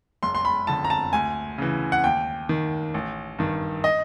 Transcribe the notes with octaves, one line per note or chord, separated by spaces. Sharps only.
F#1 C6
C6
B5
F2 D3 A5
A#5
A5
D2 G#5
C#3 E3
F#5
D#2 G5
D#3
A1
G2 D#3
D#5